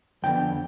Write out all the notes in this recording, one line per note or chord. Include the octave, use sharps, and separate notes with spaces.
F2 D3 F3 B3 G5